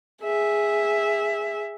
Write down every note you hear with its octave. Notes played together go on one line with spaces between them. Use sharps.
G#4 E5